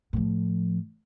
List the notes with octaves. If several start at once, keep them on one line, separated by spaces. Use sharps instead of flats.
A2 F3